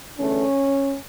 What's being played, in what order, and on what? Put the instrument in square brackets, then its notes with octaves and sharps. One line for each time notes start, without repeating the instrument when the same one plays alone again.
[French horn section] E2 D3 A3 C#4